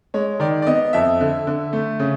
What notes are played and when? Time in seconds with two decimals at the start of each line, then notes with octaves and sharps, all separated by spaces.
0.14 G#3 C#5
0.40 D#3 D5
0.62 D5
0.67 B3 D#5
0.93 F2 E5
1.21 D3
1.47 D3
1.73 A3
2.00 C#3